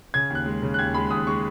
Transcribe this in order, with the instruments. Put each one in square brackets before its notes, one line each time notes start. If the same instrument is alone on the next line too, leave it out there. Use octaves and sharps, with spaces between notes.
[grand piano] C#3 G#6
D#2
F#6
G#3
C#3
F#6
D#2 G#6
G#3 B5
D#2 D#6
G#3 C#6